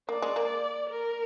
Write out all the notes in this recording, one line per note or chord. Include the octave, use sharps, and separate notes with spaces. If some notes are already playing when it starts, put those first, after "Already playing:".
A#3 D5
G#3
A#3
A#4